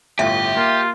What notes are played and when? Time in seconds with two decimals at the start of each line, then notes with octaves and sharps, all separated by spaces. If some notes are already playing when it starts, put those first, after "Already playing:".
0.19 G1 A2 F4 G4 E5
0.57 A#3 F4